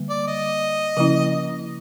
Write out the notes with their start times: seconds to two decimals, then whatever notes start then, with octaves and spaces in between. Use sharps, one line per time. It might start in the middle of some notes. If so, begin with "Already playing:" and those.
Already playing: D3 G3 A#3
0.10 D5
0.27 D#5
0.97 C#3 F3 A#3 C#4 E4